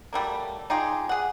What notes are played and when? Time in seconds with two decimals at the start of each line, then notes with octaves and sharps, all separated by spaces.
0.13 F#3 G3 A3 A#3
0.70 D#4 F4 G4 G#4
1.09 G#4 F#5